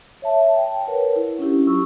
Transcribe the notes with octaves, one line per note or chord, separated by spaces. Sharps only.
C#5 E5 A5
G5
A#4 B4 C#5 F#5
E4
C#4 D4 E4 G4
F#3 F4 C#6 E6